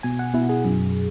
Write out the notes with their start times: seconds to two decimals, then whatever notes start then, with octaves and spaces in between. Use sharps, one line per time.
0.03 B2 G#5
0.19 F#5
0.34 B2 E4
0.49 G#4
0.65 F#2